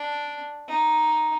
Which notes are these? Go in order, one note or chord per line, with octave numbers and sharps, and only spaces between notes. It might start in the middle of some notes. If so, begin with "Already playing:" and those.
Already playing: D4
D#4